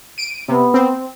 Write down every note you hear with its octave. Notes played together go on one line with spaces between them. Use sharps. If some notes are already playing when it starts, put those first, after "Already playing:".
D7 D#7
C3 B3
C4